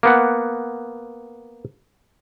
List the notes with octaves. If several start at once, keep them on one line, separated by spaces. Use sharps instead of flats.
A#3 B3 F#5